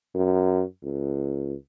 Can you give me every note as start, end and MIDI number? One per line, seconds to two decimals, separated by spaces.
0.15 0.63 42
0.83 1.54 37